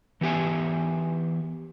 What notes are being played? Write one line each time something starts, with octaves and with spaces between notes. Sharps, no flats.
E3 B3 G4 E5 G#5